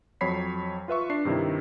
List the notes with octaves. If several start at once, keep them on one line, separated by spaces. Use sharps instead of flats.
F2 F#3 C#5 B5 B6 C7
F4 B4 E5 C#6
D4 C7
G2 C3 D#3 E4